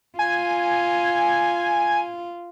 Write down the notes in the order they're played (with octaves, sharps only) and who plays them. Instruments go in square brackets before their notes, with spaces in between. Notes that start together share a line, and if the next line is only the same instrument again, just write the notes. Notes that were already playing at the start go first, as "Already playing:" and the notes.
[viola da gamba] F4 [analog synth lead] G#5